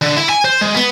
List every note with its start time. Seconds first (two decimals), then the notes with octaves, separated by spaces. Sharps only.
0.02 D3
0.16 E4
0.29 G#5
0.45 C5
0.61 G#3
0.75 B3